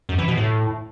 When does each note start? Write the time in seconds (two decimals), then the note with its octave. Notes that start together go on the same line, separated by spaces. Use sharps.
0.09 F#2
0.18 E3
0.28 B2
0.37 A2